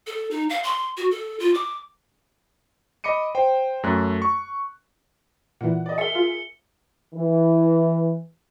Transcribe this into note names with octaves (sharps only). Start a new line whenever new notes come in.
A4
D#4
F5
C6
F#4
A4
F4
D6
D#5 B5 D6 C#7 D#7
C5 G5
F#2 A3 F#6
C#6
A#2 E3 F#5
D5 D#5
G#4 A#4 E5 C#7 G7
F4
E3